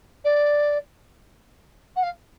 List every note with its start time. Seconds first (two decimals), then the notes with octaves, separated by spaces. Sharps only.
0.24 D5
1.96 F#5
2.03 F5